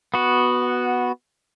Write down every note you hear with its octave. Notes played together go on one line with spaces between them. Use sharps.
B3 F#4